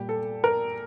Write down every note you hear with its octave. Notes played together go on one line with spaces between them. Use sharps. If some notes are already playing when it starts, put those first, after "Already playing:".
Already playing: A#2 G3 G4
A4
A#4